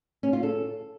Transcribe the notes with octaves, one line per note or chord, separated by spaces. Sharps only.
C#4
F4
A4